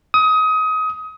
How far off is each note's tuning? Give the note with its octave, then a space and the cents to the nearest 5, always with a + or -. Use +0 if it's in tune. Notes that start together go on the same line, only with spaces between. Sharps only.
D#6 +25